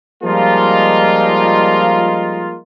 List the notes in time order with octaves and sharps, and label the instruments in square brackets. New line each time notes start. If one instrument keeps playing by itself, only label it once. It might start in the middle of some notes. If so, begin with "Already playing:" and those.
[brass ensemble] F3 G3 G#3 A#3 D#4 F4